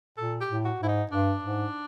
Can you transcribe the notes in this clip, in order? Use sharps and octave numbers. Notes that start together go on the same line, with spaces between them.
A#2 A4
G4
A2
F#4
G#2 E4
D#4
G2 D4
G#2